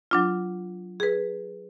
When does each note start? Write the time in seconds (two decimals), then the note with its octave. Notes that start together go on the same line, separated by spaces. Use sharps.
0.11 F#3 D4 F4
1.00 G#4 B4